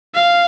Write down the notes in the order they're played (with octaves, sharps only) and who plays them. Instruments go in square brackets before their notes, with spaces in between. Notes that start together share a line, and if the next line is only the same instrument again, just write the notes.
[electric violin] F5